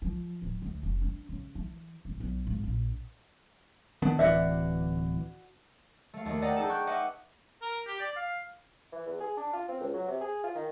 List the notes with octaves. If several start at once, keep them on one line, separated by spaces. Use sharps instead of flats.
F3
D1
D2
F1
D4
C#3
E3
G1
B1
G#1
A#1
D#3 B3 D4
D1 E3 F#4 D5 E5
A3 F5
D#2 A3 D#4
D5 D#5 F#5 G5 A#5
D#4 G#4 A4 A5
G5 C#6 F#6 G6
B4 D#5 E5 F#5 D6
A#4
G4
D5
F5
E3
E2
G#4
D4
F4
C4
C#2
F#3
C3
G#4
F4
D#3